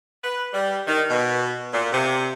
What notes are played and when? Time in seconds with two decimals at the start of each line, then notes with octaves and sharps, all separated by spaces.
0.24 B4
0.54 G3
0.87 D#3
1.10 B2
1.73 A#2
1.92 C3